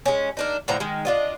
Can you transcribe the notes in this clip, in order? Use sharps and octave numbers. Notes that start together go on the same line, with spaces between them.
G#3 C#4
A#3 D4 D#4
A2 D3 F3 A#5
D#3 G#3
D4 F4 D#5